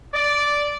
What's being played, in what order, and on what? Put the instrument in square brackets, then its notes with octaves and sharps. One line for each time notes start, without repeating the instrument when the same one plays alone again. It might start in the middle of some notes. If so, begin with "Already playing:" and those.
[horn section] D5